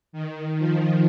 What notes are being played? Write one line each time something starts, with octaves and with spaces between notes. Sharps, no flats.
D#3
F3